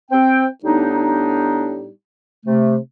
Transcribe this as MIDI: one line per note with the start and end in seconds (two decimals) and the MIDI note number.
0.11 0.46 60
0.11 0.46 79
0.64 1.87 45
0.64 1.87 55
0.64 1.87 59
0.64 1.87 62
0.64 1.87 63
2.45 2.77 48
2.45 2.77 57